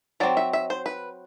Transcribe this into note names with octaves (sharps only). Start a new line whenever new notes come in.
F#3 C4 D5
E5
E5
C5
B4